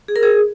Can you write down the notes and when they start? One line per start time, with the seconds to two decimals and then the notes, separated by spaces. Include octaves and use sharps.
0.08 G#4
0.16 A#4
0.23 G#4